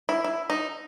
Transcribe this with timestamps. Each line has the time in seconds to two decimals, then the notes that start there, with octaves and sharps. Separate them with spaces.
0.09 E4
0.24 E4
0.50 D#4